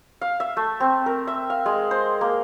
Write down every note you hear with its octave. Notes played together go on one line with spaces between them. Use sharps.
F5
E5
A3
C4
A#4
E5
F5
G#3
C5
A#3